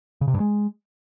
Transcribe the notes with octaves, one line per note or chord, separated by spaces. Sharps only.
C#3
C3
G2
G#3